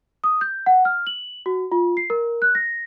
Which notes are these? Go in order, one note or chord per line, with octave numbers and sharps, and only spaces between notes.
D#6
G6
F#5
F6
F#7
F#4
F4
C7
A#4
F#6
A#6